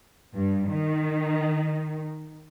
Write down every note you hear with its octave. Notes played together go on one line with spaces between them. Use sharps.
G2
D#3